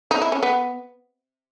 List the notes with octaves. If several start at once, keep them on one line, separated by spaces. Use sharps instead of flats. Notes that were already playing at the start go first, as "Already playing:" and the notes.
D#4
E4
C#4
B3